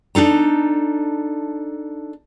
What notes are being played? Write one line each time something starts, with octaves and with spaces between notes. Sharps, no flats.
D4 D#4 A4 A#5